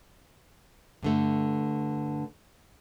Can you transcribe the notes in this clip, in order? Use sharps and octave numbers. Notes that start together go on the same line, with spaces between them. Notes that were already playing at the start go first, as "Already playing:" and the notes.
G2 D3 A3